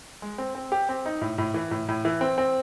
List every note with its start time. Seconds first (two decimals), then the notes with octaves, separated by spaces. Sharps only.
0.22 G#3
0.38 C4
0.55 C4
0.72 G4
0.89 C4
1.06 D#4
1.22 A2
1.38 A2
1.54 E3
1.71 A2
1.89 A2
2.05 E3
2.21 C4
2.38 C4